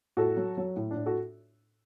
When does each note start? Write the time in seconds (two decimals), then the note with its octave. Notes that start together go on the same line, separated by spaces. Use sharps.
0.17 A2 F#4 A4
0.37 F#3
0.57 F#3
0.76 A2
0.91 D4
0.96 A2
1.06 F#4 A4